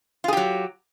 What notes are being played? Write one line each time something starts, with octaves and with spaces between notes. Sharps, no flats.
F#3 F4 G4 G#4